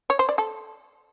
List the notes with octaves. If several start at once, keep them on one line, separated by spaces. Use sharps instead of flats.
C#5
C5
D5
A4